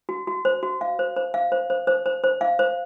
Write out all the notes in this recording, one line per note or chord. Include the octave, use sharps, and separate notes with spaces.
F#4
F#4
C5
F#4
F5
C5
C5
F5
C5
C5
C5
C5
C5
F5
C5